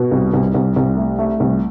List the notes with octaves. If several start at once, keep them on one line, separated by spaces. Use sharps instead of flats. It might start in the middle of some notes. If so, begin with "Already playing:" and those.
Already playing: B2
C2
C2
C2
C2
A3
A3
C2